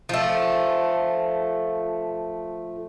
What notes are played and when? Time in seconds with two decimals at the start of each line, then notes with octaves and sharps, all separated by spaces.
0.09 F3 A3